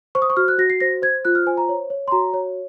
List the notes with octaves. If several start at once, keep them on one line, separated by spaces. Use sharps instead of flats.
C5 C#6
D#6
C#6
F#4 F6
F#6
F#4 A#6
C7
C5 A#6
C5 G#6
F4 F#6
F6
C5 G#5
A#5
C#5
C#5
C6
F#4 A#5
C#5